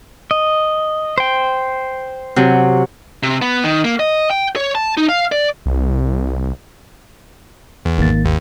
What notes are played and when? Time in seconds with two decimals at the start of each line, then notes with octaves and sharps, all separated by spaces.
0.31 D#5
1.18 C5 G5
2.36 C3 F#3
3.23 C3
3.42 B3
3.64 D#3
3.85 A#3
3.99 D#5
4.31 G5
4.56 C#5
4.75 A5
4.97 D#4
5.09 F5
5.32 D5
5.66 C2
7.85 E2
7.98 G#1 D#3 A#3 A6
8.25 D#2